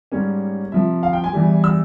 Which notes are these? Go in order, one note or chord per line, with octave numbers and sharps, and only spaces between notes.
G#2 G3 A#3 C#4 C#5
C3 F3 A#3 E5
F5
G5
G#5
E2 E3 G3
E6